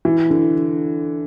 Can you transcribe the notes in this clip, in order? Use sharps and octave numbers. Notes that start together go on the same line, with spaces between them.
E3
D3